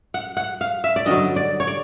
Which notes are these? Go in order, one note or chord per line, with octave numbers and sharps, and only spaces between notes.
F#5
F#5
F5
E5
D5
G2 D3 F#3 D#5
D5
C#5
D5